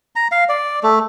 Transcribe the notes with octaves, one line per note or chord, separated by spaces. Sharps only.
A#5
F5
D5
A3